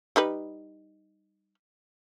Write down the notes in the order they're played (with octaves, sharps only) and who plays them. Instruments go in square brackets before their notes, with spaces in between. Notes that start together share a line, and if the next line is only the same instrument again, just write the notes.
[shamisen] G3 D#4 B4